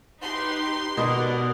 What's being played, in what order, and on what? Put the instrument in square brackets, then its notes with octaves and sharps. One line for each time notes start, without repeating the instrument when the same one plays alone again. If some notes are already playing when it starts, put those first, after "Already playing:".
[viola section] D#4 G4 B4 [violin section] C6
[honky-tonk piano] B2 [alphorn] B3 [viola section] A#4 D5 F#5